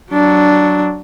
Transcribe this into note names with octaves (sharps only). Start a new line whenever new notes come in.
F#3 D4